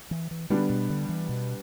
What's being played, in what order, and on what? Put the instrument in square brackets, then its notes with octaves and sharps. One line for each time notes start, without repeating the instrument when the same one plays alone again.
[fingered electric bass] E3
E3
[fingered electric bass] D3 [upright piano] G3 B3 D4 B4
[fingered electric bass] B2
D3
E3
B2